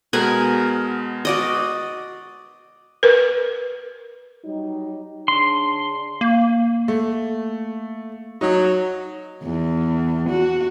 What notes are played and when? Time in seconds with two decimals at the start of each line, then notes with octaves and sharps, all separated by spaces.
0.13 B2 G#3 B3 A#4 F#5 G#5
1.25 F#4 D5 D#5
3.03 A#4 B4
4.44 F#3 G3 D#4
5.28 C#3 D4 C6
6.21 A#3
6.88 A3
8.41 F#3 D#4
9.43 E2
10.29 F#4